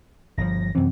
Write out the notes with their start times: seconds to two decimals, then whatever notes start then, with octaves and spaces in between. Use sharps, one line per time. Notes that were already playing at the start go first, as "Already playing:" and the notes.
0.38 G1 C#3 F3 A#6
0.75 F#2 C3 E3 C4